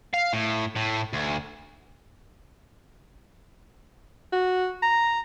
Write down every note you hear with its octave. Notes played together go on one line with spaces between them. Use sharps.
F5
A2
A2
D2
F#4
A#5